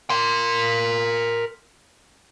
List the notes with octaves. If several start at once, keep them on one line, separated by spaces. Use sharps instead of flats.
A#4 C6